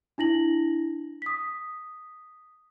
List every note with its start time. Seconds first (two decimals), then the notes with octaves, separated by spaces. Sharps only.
0.18 D4 E4 A#6 F#7
1.22 D#6 B6